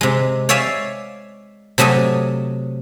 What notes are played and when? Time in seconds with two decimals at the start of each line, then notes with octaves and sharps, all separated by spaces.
0.01 C3 G#3
0.49 C#5 D5 E5 F5 G#5
1.78 C3 F#3 A3 D#5 G#5